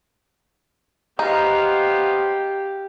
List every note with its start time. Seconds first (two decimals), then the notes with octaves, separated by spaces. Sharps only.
1.19 B3 D#4 G4 C5 F5